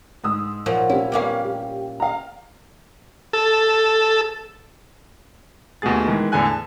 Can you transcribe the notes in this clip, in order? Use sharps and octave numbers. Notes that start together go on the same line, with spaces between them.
G#2 D#6 E6
A#2 F3 F#3
C#4 E4 G4
G3 A#3 B3 C#4 F5
G4
F5 A#5
A4
D#2 B2 A3 B3 G#4 A6
D#3 E3 G#3
E2 A2 D3 A4 G#5 F#6
A5